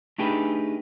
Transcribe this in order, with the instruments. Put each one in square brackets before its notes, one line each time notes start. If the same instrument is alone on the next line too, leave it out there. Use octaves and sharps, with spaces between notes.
[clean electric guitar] A3 D4 D#4 G4 G#4 B4